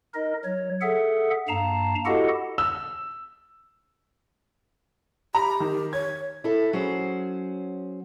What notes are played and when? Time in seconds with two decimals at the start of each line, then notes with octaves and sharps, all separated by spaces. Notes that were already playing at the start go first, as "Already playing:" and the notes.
0.14 D#4 A#4 D#5
0.45 F#3 C#5
0.81 G#4 A4 E5 F#5
1.48 G2 A#3 F5 A5 A#5
2.05 E4 F#4 G4 A4 D#5 F#5
2.58 E6
5.35 G4 A#5 B5
5.60 D#3
5.93 C#5 G#6
6.44 E4 A4
6.73 F#3 C#4 G#4 C5